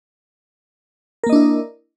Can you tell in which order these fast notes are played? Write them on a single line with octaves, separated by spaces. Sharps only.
A#4 A#3 D#5 D4 E4